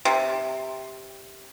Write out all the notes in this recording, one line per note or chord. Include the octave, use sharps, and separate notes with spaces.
C3